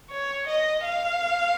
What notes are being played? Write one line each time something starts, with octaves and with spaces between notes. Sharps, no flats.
C#5
D#5
F5